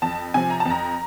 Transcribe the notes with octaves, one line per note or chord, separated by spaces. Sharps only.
F2 A5
C3 F3 G#5
A#5
A5
F2 A#5